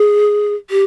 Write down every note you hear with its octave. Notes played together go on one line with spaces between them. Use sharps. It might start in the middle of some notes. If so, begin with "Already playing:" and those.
Already playing: G#4
G4